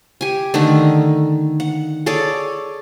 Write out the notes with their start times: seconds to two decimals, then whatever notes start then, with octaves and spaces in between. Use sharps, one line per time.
0.21 G4 G#5
0.54 D3 D#3 A3 D#4
1.60 F#5
2.06 G#4 A4 C#5 D5